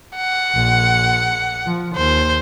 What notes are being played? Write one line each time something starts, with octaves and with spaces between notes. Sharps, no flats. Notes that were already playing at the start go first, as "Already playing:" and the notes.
F#5
A#1
F3
D#2 C5